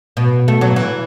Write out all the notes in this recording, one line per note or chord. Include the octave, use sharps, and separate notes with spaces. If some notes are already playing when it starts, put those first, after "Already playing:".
B2
A3
F#3
E3